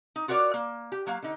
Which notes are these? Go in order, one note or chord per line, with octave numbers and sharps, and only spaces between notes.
D#4
F4 F#4 A#4 C#5 D5
A#3
G4
F#3 A#3 F5
D3 D#4